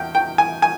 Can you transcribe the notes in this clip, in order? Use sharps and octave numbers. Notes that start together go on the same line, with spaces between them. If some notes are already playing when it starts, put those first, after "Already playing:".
Already playing: E2 G5
G5
G#5
G#5